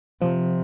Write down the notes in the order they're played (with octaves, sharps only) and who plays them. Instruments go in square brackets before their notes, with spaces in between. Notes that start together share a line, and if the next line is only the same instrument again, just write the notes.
[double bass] C3 [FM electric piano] F3